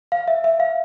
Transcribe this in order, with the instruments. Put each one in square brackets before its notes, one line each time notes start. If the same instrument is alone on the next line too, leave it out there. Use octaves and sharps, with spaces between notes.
[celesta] F5
E5
E5
F5